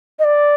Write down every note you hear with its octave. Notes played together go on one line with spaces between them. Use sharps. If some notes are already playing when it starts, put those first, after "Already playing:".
D#5
D5